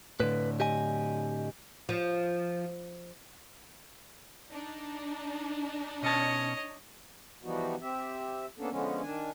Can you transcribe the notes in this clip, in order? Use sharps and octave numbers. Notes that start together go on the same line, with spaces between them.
A2 D3 B4
G4 D#5 G#5
F3
D4 D#4
B2 C#4 C#5 D#5 A5
E3 F3 G3 B3 D#4 F#4
C4 G4 E5
A#3 B3 C#4 D4 A4
D3 F3 G#3 B3 C#4
D#3 D4 G#5